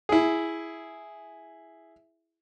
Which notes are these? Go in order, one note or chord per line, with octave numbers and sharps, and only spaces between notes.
E4 G#4